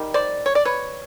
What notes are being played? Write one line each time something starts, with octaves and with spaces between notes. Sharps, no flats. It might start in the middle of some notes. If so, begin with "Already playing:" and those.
Already playing: D#3 G3
C5 D5
C#5
D5
B4 C#5